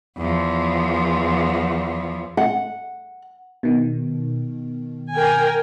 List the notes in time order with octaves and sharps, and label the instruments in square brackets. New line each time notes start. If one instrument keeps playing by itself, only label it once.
[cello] E2 F3
[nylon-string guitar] F#5
[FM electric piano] B2 D#3
[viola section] A#4 G5 G#5